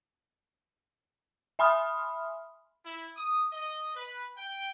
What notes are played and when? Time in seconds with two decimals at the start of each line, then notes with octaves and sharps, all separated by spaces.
1.59 E5 G#5 B5 C6 D#6 F6
2.85 E4
3.16 D#6
3.52 D#5
3.96 B4
4.37 G5